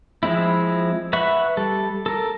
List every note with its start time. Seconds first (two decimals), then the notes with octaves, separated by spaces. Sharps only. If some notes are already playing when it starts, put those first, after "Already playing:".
0.23 F3 G#3 C4 E4
1.13 B4 E5 F#5 B5 C#6
1.57 G3 A4
2.06 A4 A#4